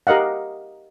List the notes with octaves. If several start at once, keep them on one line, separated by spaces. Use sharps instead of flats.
G4 A#4 D#5 F5 F#5